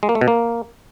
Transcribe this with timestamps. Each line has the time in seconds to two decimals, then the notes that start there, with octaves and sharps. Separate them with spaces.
0.03 G#3
0.09 A#3
0.15 A3
0.21 B2
0.28 A#3